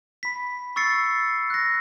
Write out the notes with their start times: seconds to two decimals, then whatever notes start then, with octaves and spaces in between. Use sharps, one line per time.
0.23 B5 B6
0.76 C#6 E6 A6 C7 C#7
1.50 F#6 A#6